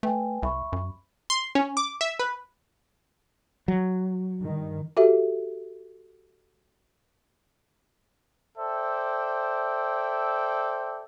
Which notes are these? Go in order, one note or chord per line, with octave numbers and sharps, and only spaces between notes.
A3 B4 G5 G#5
C2 E5 B5 C#6
F#2
C6
C#4
D6
E5
B4
F#3
G2 D#3
F#4 G4 A4 E5
A4 C5 D5 E5 G5